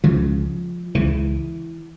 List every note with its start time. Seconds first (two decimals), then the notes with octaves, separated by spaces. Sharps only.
0.04 C#2 C#3 F3
0.95 C#2 C#3 E3